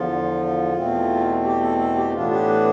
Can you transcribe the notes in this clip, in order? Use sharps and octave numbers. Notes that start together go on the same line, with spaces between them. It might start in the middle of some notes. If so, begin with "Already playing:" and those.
Already playing: E2 D3 F3 F4
E2 B2 A3 C4
G4
A4
A4
G4
A2 E3 B3 D4 F4
G4
B4